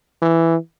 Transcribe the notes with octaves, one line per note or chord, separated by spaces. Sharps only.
E3